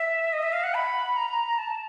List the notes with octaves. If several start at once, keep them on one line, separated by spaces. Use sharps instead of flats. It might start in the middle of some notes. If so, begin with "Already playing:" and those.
Already playing: E5
D#5
E5
F5
F#5
B5
A#5
A5